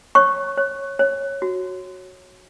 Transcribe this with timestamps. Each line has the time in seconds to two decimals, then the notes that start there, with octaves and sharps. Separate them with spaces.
0.15 C#5 C#6
0.58 C#5
0.99 C#5
1.42 F#4